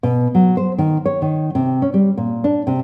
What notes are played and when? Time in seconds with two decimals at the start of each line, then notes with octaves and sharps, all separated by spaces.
0.03 B2
0.35 F#3
0.57 C5
0.78 D#3
1.06 C#5
1.22 D#3
1.55 C3
1.82 C#4
1.94 G3
2.18 A#2
2.44 D4
2.67 C3